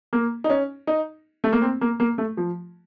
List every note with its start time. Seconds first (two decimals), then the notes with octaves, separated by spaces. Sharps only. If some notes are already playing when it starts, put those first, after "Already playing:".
0.13 A#3
0.44 D#4
0.50 C#4
0.87 D#4
1.44 A3
1.53 A#3
1.62 C4
1.81 A#3
2.00 A#3
2.18 A3
2.37 F3